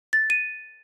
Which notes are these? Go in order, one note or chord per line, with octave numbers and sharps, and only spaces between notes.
A6
D#7